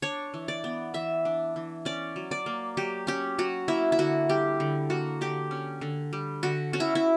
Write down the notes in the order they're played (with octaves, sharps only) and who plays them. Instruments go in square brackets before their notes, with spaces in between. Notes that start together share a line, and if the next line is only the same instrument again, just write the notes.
[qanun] D4 C#5
E3
D5
B3
E3 E5
D4
E3
C#4 D5
F#3
D5
A#3
F#3 G4
C#4 G4
F#3 F#4
A#3 E4
E4
D3 F#4
G3 G4
D3
A#3 F#4
D3 G4
C#4
D3
G3
D3 F#4
C#4 F#4
E4
E4